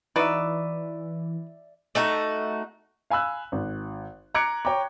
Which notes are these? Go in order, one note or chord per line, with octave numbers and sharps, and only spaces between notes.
E3 D#4 F#4 B4 D5 E5
A3 D#4 F#4
F5 G#5 B5 E6 F#6
G#1
A#5 D6 F#6 G#6 C#7 D7
C#5 G5 A#5 D6